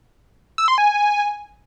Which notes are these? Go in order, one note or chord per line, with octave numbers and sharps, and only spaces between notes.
E6
C6
G#5